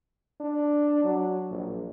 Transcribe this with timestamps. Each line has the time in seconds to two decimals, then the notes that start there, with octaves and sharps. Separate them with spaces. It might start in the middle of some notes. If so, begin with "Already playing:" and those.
0.40 D4
1.04 F#3
1.50 A#1